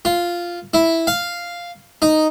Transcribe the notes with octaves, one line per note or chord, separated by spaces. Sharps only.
F4
E4
F5
D#4